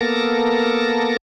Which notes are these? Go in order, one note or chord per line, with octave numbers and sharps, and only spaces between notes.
A#3 B3 A4 A#4 A5 A#6